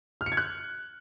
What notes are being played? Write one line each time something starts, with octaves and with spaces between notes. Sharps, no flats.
F6
C#7
G#6
F#6